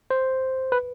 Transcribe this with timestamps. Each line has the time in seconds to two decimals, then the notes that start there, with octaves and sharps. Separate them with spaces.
0.11 C5
0.72 B4